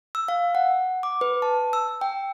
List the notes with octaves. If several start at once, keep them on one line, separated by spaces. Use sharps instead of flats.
E6
F5
F#5
D6
B4
A5
E6
G5